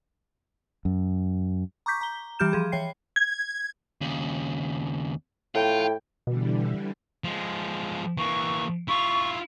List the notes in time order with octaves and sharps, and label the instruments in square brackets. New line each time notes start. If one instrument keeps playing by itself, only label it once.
[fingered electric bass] F#2
[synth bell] A#5 C#6 D6 G6 B6
A#5 G7
E3 G3 G4 F6 G6 E7
F3 G#4
E3 C#5 G5 C7
G#6
[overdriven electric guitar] D#2 C#3
[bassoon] A2 [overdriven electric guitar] F4 [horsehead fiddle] G5
[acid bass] B2 [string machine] D3 E3 G3
[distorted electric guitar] F3 G#3
[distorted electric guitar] E3 A#3 [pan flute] C#6
[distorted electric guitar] E4 F4 [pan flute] C#6